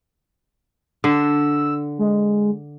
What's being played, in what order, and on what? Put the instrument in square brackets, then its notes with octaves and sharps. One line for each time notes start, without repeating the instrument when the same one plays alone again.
[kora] D3 [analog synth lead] E6
[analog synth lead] G#3